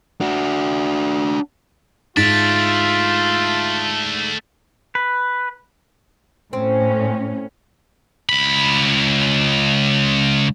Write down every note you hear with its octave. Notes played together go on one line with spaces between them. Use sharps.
D4 F#4
G#2 A3 D4 F4 A6 B6 D7
B4
A2 C4 C#4
C#2 B5